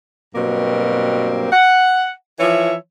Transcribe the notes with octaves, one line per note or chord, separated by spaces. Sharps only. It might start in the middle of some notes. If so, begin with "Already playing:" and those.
G2 B2 F#3 A#3 C4
F#5
E3 F3 C#5 E5